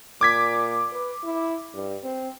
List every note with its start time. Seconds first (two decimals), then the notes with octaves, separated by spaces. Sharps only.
0.21 A#2 D6 G#6 B6
0.92 B4
1.24 E4
1.74 G2
2.04 C4